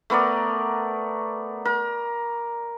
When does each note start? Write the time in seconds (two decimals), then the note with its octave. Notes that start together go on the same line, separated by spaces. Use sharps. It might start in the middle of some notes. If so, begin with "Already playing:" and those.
0.10 A3 B3 A#4 D5
1.65 A#4